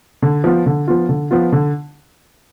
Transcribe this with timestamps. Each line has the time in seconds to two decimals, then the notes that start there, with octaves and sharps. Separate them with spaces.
0.22 D3
0.44 F3 B3 F4
0.66 D3
0.88 F3 B3 F4
1.09 D3
1.31 F3 B3 F4
1.52 D3